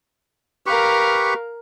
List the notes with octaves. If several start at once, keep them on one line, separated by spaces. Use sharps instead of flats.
G4 A#4 B4 F5 C#6